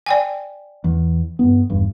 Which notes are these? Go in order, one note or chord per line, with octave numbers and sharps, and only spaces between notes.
D5 G5 G#5
E2
G2 B3
G#1 E2 G2